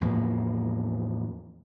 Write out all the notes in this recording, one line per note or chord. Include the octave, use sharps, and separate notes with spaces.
E2 A2 F3 A#3